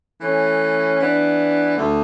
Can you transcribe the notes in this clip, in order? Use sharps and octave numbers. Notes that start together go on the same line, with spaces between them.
E3 A3 C#4
E3 B3 D4
D2 D3 A3